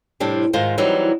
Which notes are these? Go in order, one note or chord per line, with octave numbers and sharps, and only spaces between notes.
A2 C3 G3 C4 D4
G#2 D#3 F4 C5
E3 F#3 G3 C4 D#4